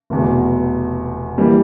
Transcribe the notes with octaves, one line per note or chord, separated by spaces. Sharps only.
F1 E2 B2
E3 G3 A#3